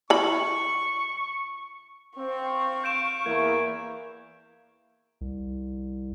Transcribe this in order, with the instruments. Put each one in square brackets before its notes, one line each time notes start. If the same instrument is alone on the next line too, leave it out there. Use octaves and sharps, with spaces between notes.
[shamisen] E3 B5 [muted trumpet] C#6
[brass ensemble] C4 [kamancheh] F5 C#6
[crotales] G6 D7 E7
[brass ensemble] E2 E4 [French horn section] E3 A#3 [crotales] G#6
[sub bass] C2